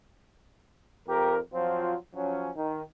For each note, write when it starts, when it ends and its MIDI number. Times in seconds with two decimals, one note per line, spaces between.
1.08 1.38 41
1.08 1.38 67
1.08 1.38 70
1.54 1.95 53
1.54 1.95 54
1.54 1.95 60
1.54 1.95 65
2.15 2.50 53
2.15 2.50 54
2.15 2.50 61
2.56 2.83 51